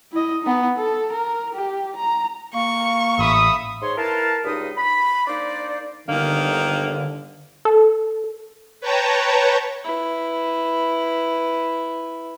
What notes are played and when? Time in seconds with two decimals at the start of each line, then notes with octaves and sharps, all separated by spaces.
0.12 E4 D#5
0.43 B3 D#4
0.76 A4
1.12 A#4
1.54 G4
1.96 A#5
2.55 A#3 C#6
3.19 A1 E5 B5 D#6
3.81 G#2 C#5 C6
3.96 E4 A#4 B4 F5 A5
4.43 C#2 G2 D#4 B5 D#6
4.77 B5
5.27 A#3 D4 D#4 C5 D5
6.08 G1 D3 D#3 A#3
7.65 A4
8.81 B4 C#5 G5 A5 A#5
9.84 E4 B4